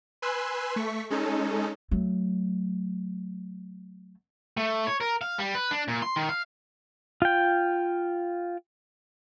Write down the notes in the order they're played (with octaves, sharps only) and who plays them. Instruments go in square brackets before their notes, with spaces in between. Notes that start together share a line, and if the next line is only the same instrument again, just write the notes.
[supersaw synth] B4 G#5 C6 E6 F#6
A3 C#6 B6
G#3 C#4 D#4 A4
[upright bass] F#3 A3
[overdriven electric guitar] A3
C#5
A#4
F5
G3
B4
D4
A#2
C6
D#3
F5
[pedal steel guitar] F4 G5